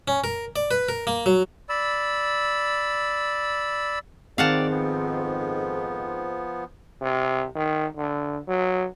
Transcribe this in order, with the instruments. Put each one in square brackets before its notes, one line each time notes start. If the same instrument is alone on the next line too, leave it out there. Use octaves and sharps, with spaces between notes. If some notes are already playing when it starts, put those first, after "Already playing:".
[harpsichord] C#4
A#4
D5
B4
A#4
A#3
F#3
[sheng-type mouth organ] D5 B5 E6
[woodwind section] F2 G#2 [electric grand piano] D#3 C4 [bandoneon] D5 [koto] F5 F#5 A5
[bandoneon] F3 B3
[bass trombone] C3
D#3
D3
F#3